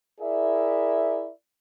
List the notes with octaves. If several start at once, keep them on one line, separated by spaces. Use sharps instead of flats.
E4 G#4 A#4 D5 E5